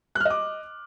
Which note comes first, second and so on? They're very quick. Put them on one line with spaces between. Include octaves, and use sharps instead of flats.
F#6 F6 D#5 D6